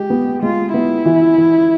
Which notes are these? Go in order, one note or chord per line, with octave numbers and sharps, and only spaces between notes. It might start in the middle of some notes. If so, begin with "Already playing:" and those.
Already playing: G#3 G4
B3
G#3 F4
B3 E4
E3
E3